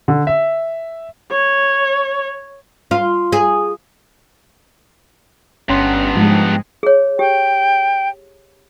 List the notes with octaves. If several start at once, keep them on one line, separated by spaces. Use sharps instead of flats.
D3
E5
C#5
F4
G#4
G1 G2 B3 C#4 C6
G#2 F3 G#3
G#4 C#5
G4 G5